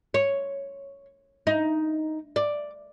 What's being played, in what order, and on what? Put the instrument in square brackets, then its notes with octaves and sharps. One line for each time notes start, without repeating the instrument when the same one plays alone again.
[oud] C#5
D#4
D5